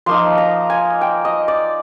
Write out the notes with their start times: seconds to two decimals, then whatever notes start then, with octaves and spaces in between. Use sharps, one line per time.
0.06 F3 A#3 D#4 C6
0.38 A#5
0.70 G#5
1.01 G5
1.25 D#5
1.48 D5